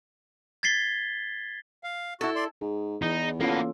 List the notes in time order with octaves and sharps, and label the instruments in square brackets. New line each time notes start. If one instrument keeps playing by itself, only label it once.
[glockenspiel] G#6 A6 B6 C7 G7
[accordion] F5
[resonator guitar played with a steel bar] E4 A4 [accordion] F#4
[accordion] D5 C6
[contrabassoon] G#2 [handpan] G#4
[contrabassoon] E2 [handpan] E3 [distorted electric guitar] D#4
[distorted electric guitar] A#3 B3 [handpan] C#4 F4 A4